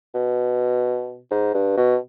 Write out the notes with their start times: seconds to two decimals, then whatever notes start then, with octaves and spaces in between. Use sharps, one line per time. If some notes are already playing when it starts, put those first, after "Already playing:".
0.14 B2
1.31 G#2
1.54 G2
1.77 B2